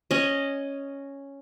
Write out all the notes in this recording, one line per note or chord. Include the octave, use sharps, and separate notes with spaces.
C#4 D#5